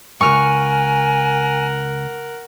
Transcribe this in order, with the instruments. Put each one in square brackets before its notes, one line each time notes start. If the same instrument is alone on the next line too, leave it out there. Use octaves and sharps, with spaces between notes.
[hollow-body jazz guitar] C#2 G2 [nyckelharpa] A#4 F#5 [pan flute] G#5 [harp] C#6 F6